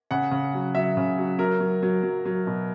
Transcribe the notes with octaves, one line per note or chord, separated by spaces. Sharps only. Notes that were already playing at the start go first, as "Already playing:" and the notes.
C#3 F#5
C#3
F#3
F#3 E5
C#3
F#3
F#3 A#4
F#3
F#3
F#3
F#3
B2